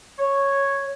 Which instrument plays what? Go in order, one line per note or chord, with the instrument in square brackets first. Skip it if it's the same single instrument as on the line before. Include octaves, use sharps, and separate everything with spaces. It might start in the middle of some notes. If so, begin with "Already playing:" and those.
[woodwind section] C#5